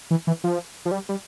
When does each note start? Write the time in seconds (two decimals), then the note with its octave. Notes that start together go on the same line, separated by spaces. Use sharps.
0.11 E3
0.27 E3
0.44 F3
0.85 F3
0.91 G3
1.09 G3